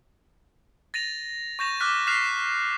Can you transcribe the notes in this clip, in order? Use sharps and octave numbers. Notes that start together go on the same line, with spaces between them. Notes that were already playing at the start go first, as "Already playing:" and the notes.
A6 A#6 D#7 F7
C#6 G6 A#6 E7 F7
D6 F6 F#6 B6
F6 F#6 B6 C7 E7 F7